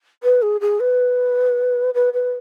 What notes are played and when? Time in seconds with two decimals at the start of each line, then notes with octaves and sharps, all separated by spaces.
0.23 B4
0.42 G#4
0.61 G#4
0.80 B4
1.94 B4
2.13 B4